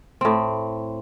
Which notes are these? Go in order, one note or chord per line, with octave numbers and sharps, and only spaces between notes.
A2 C4